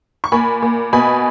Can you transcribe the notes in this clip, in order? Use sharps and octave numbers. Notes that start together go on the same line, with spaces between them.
C#6
A#2 G#5 B5
A#2
B2 G#5 B5